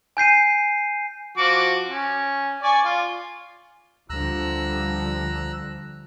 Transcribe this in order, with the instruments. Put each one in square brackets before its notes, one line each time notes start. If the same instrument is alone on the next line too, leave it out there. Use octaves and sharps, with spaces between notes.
[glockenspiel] G#5 G6 C7 D#7
[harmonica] F3 F#4 D6
C#4
D5 G#5 C#6
F4
[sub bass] D2 [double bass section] D3 F3 G3 [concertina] A#5 E6 F#6